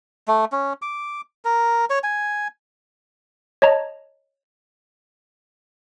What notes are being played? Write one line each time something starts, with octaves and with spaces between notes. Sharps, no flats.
A3
C#4
D6
A#4
C#5
G#5
C#5 D#5 A5 A#5